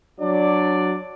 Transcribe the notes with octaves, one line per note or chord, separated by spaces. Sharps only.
F#3 D4 D5